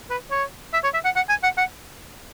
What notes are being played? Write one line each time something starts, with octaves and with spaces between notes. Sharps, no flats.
B4
C#5
E5
C#5
E5
F#5
F#5
G#5
F#5
F#5